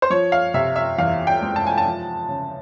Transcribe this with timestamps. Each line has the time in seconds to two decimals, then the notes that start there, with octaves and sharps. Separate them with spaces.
0.02 C5
0.10 F3 C#5
0.32 F5
0.54 C3 E5
0.76 E5
0.98 E2 F5
1.27 G5
1.42 G#3
1.56 A5
1.67 G#5
1.78 A5
1.85 F3
2.29 C#3